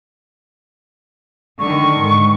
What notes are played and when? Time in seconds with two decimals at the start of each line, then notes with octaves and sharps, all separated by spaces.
1.59 D3 D#3 C#6
2.00 G#2